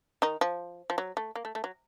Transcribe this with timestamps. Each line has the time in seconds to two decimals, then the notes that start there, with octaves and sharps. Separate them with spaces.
0.22 D#3 D#4
0.41 F3
0.90 F3
0.98 F#3
1.17 A3
1.36 A#3
1.45 A3
1.55 A3
1.64 F#3